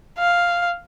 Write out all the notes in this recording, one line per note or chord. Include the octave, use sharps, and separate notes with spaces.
F5